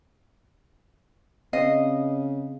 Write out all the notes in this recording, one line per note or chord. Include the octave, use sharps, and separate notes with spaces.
C#3 C4 D#5 F5